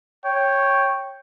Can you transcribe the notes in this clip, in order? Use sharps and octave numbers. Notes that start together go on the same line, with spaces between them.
C#5 G5